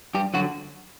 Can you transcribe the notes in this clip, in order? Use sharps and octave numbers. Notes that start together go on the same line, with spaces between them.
G2 G4
D3 F#3 F#4